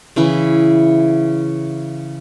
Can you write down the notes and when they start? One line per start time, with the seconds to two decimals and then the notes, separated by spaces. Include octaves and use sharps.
0.16 C#3 E3 E4 B4